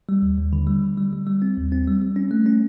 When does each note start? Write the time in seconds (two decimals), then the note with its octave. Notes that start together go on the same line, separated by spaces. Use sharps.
0.09 G3
0.22 D#2
0.38 D#2
0.53 D3
0.67 G3
0.83 D3
0.98 G3
1.13 G3
1.27 G3
1.42 C4
1.57 D#2
1.72 C4
1.87 G3
2.02 G3
2.16 C#4
2.31 A3
2.46 C#4